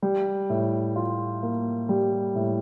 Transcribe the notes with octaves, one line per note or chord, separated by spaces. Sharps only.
G3
A2
F4
A#3
G3
A2